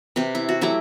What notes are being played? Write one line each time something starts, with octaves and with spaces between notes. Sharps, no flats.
C3 G4 B4
E4
F#4
F#3 A3 E4 G4